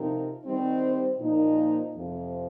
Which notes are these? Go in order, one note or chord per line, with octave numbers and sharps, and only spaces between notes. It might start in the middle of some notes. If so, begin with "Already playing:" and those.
Already playing: C3 F3 C4 D#4 A#4
D#3 G3 C4 D#4 C5
A#2 F3 A#3 D#4
F2 C3 F3